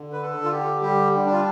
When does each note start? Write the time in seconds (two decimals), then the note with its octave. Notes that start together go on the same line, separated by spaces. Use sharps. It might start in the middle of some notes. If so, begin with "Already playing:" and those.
Already playing: D3
0.12 B4
0.22 A4
0.37 D3
0.44 F4
0.51 G4
0.81 G3 G4
1.26 D4
1.33 F4